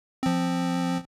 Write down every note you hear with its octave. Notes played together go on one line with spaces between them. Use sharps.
F3 C4